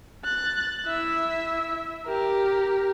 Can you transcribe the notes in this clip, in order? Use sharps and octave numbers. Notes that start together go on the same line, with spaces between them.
F#6 A6
E4 E5
G4 A#4